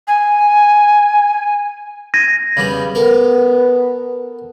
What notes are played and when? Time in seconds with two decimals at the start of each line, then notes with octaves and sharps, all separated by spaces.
0.08 G#5
2.14 G#6 A#6 D#7
2.57 C#3 G3 B3
2.95 B3 A4 A#4